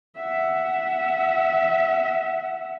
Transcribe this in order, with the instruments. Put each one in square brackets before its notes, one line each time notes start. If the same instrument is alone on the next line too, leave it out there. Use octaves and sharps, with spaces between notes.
[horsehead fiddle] E5 F#5